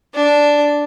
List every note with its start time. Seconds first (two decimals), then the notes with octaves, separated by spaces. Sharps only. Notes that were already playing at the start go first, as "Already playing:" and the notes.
0.15 D4